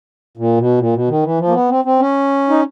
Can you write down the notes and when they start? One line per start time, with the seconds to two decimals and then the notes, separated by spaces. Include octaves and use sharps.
0.37 A#2
0.58 B2
0.78 A#2
0.93 B2
1.08 D#3
1.23 E3
1.39 F3
1.48 A#3
1.54 B3
1.69 C4
1.85 C4
1.99 C#4
2.49 D#4